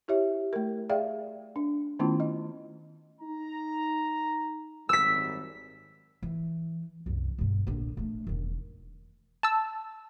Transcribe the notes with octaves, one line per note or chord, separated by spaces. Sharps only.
E4 G4 C#5 E5
A3 A#4
G#4 D5 E5 F5 G5
D4
D#3 A3 B3 C#4 E4 F4
D#5
D#4 A#5
G#1 F#2 G3 E6 B6
E3
C2 F#2
G2 B2
A#1 D3
A3 D4
E1 D#3
A5 E6